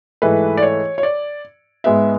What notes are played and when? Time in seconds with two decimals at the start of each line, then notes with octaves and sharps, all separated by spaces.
0.22 G#2 E3 A3 B4
0.57 D5
0.62 C#5
0.98 C#5
1.03 D5
1.84 G#2 G#3 B3 E5